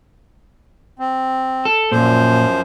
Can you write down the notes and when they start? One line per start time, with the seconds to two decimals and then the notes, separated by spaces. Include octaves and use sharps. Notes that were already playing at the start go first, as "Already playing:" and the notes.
0.99 C4
1.65 A4
1.92 F#2 A#2 F3 C5